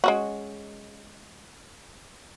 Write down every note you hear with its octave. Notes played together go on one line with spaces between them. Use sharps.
G#3 C#4 F#4